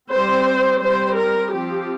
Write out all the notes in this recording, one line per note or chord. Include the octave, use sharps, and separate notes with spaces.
G3 C4 C5
G3 C4 C5
A#4
F3 C4 G4